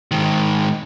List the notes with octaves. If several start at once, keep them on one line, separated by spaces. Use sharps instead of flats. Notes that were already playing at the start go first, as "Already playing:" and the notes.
G#2 D#3